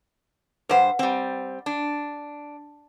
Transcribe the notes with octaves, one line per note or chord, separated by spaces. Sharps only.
G2 B4 C5 F5 F#5
G3 C4
D4